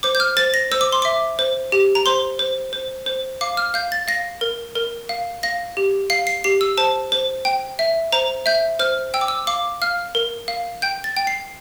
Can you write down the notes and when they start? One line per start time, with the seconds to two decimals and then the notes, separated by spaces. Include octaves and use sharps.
0.03 C5 D6
0.15 G6
0.20 F6
0.37 C5 A6
0.54 A#6
0.72 C5 E6
0.81 D6
0.92 C6
1.02 E5 D6
1.39 C5
1.72 G4
1.95 A#5
2.06 C5 C6
2.39 C5
2.73 C5
3.06 C5
3.41 F5 D6
3.57 F6
3.74 F5 G6
3.92 A6
4.08 F5 A#6
4.41 A#4
4.76 A#4
5.09 F5
5.43 F5 A#6
5.77 G4
6.10 F5 C7
6.27 C7
6.44 G4 C7
6.61 E6
6.78 C5 A5
7.12 C5
7.45 G5
7.79 E5
8.12 C5 A#5
8.46 E5 G6
8.79 C5 F6
9.14 G5 E6
9.21 D6
9.28 E6
9.47 F5 D6
9.82 F5 F6
10.15 A#4
10.48 F5
10.82 G5 G6
11.04 A6
11.17 G5
11.27 C7